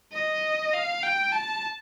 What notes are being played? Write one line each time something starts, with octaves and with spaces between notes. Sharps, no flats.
D#5
F5
G5
A5